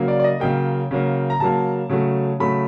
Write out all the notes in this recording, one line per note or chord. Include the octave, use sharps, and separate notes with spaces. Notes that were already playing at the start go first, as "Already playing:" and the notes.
Already playing: C#3 F#3 A#3
D5
D5
D#5
C#3 F#3 A#3 G5
C#3 F#3 A#3
A#5
C#3 F#3 A#3 A5
C#3 F#3 A3
C#3 F#3 A3 B5